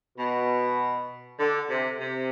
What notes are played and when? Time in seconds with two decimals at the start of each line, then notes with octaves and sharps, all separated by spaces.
0.18 B2
1.40 D3
1.70 C3
2.00 C3